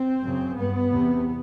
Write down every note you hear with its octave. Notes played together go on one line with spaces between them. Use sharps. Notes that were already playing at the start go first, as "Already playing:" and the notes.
Already playing: C4
F#2 C#3
G2 B3
E2 C3